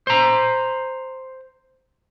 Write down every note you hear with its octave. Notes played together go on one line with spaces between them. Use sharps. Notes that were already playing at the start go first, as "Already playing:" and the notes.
C5 A#5